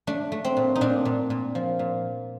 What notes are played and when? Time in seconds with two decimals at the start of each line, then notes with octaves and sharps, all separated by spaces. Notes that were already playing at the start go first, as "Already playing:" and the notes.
0.07 A3 D4
0.32 A3
0.45 C4
0.57 A#2
0.75 D#4
0.81 A#2 D4
1.05 A#2
1.30 A#2
1.55 F3
1.79 A#2